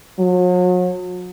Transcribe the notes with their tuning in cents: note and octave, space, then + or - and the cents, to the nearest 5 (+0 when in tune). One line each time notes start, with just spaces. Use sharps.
F#3 -40